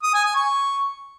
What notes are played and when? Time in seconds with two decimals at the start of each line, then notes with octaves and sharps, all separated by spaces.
0.03 D#6
0.14 G#5
0.25 G#5
0.36 C#6